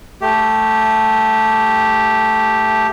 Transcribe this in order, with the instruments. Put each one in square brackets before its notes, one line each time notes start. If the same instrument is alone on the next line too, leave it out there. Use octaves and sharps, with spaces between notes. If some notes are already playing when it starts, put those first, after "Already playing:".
[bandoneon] A3 G4